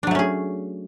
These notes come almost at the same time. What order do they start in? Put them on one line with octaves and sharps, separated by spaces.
D4 F#3 A3 C#4 G#4